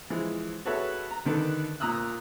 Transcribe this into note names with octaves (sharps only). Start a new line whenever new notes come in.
E3 F3 G#3
F#4 G#4 A4 B4 C#5 E5
A#5
D3 D#3 A4 B4
A#2 A#5 D#6 E6 F#6